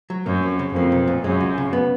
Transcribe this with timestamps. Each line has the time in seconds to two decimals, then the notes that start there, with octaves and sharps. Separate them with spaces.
0.10 F#3
0.26 F#2 A#3
0.43 F2
0.59 C#3
0.76 F2 A#3
0.92 B1
1.08 A#2
1.24 F#2 G#3
1.40 C#2
1.58 C#3
1.73 B3